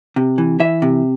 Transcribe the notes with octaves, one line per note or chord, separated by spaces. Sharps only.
C3
E3
E3 E5
C3